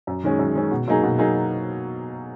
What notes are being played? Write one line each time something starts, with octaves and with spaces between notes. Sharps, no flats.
F#2
D#3 G#3 C#4
F#2
D#3 G#3 C#4
B2
F#3 A#3 D#4 G#4
B2
F#3 A#3 D#4 G#4